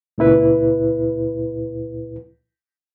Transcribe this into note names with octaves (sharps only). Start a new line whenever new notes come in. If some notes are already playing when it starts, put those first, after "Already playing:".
C#2 A#2 E4 B4